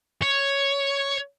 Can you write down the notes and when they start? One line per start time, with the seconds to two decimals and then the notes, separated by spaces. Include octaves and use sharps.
0.22 C#5